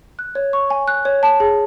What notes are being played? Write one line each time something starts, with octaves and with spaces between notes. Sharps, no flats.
F#6
C#5
C#6
G#5
F#6
C#5
A5
G#4